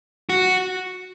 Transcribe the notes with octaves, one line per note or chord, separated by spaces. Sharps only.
F#4